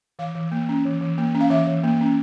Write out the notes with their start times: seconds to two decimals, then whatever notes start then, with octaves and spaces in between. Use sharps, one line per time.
0.19 E3 F5
0.35 E3
0.52 A#3
0.69 C#4
0.86 E3
1.01 E3
1.18 A#3
1.35 C#4
1.41 F5
1.50 E3 E5
1.67 E3
1.84 A#3
2.01 C#4